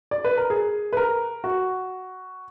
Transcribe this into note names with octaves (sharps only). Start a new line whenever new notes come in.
D5
B4
A#4
G#4
B4
A#4
F#4